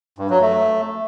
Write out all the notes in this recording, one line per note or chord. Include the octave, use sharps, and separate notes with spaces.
G2
F#3
A3